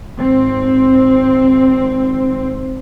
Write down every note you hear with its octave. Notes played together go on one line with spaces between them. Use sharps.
G#1 C4